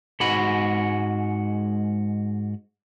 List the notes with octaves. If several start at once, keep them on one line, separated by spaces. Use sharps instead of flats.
G#2 G#3 F#4 B5